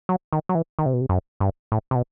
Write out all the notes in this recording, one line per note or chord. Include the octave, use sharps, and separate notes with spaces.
F#3
D#3
F#3
E3
D#3
C3
B2
C3
F#2
G2
A2
C3
B2